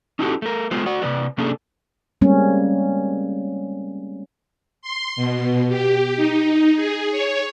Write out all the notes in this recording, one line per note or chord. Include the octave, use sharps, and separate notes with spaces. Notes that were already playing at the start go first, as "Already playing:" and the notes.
C#4 D#4 E4 F#4 G4 A4
A3 A#4
G#3 A3 B3 F4 C5
F#4 D5 F#5
C3 G#3 B4 D5
C3 A#3 C#4 D4 G#4 A4
G3 G#3 A#3 C4 C#4
C6
B2
G4
D#4
G#4
C#5